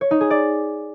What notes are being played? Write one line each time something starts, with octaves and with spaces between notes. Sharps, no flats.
C#5
D#4
G#4
D5